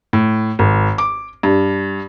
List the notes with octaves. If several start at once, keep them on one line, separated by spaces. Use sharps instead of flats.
A2
G#1
D6
G2